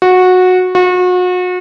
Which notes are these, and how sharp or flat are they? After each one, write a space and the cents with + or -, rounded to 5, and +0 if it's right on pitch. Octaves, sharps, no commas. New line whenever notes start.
F#4 -15
F#4 -35